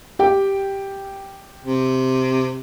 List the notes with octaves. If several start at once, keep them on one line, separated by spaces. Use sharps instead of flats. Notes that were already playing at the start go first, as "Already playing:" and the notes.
G4 G5
C3